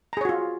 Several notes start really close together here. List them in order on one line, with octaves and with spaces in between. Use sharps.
A#5 G#4 C#5 F#4 F4